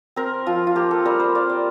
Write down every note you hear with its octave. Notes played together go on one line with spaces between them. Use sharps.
C4 A#4
F3 F4
F4
A#3 G4
A4
G3 A#4
C5
A#3 D5
D5